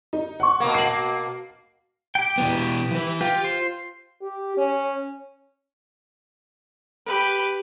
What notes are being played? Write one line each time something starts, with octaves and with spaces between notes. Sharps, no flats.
D#4
F#5 C#6
B2 A#3
C7 F#7
G4 G5
B2 E3 B3
E3 B4
F4 G4
C5
G4
C#4
G4 B4